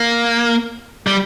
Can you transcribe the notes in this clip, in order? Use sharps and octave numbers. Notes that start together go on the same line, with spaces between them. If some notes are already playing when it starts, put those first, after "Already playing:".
Already playing: A#3
G3